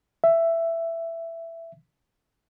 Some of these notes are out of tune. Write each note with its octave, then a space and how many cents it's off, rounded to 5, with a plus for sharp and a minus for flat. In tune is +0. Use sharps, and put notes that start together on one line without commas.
E5 +10